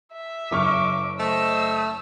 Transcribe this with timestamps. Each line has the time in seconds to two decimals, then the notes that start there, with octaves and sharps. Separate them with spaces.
0.13 E5
0.51 F#1 C#6 D6 F6
1.19 A3 C5 D#5 E6